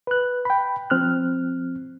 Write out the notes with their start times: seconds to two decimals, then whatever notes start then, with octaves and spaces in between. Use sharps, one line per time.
0.07 B4 F#6
0.45 G5 B5
0.90 F3 C4 F6 F#6